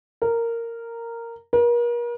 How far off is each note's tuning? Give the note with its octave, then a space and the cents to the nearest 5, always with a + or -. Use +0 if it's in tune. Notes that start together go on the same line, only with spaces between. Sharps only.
A#4 -10
A#4 +40